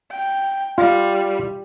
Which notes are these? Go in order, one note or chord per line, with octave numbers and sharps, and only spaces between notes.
G5
G3 F4